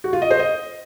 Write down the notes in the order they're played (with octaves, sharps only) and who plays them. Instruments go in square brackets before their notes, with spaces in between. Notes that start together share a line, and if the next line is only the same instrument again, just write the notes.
[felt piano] F#4
F4
D#5
C5
D#5